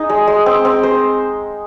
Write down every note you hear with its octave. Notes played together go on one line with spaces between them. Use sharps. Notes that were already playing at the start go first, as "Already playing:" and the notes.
Already playing: D#4 G#4
G#3
G#3
C4
C4
C5